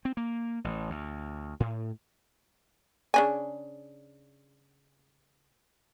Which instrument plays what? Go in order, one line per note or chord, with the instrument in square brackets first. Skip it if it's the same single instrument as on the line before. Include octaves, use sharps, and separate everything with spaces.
[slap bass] C4
A#3
A1
D2
A2
[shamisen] C#3 D4 G#5